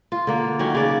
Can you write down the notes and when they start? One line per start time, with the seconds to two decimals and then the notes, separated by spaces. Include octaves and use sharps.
0.12 F4
0.27 D3 A#3
0.59 D#3 F#3 C#4
0.75 C#3 D5